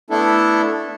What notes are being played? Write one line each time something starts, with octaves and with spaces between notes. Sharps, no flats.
A3 B3 D4 E4 A4